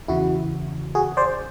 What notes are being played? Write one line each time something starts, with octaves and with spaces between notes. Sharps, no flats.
E2 C#3 E3 E4 F#4
F#4 G#4
C5 D5